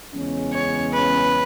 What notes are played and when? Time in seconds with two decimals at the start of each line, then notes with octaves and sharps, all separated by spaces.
0.14 E2 C#3 G#3 C#4
0.53 C#5
0.93 B4